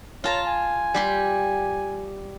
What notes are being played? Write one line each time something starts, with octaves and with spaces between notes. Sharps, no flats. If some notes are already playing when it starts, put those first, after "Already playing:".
F4 C#5 A5 A#5
G#5
G3 G4 C6